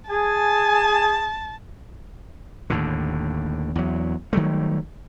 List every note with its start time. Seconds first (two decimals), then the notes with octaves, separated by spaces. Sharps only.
0.10 G#4 G#5 A5
2.70 D#2 A2 D3
3.76 E2 F#3
4.33 D#3 F#3 G3 A3